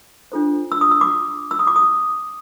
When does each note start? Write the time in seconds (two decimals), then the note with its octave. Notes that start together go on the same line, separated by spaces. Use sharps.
0.32 D4 F4 A4 C5
0.72 E6
0.81 D#6
0.91 E6
1.01 D6
1.51 E6
1.59 D#6
1.67 D6
1.76 D#6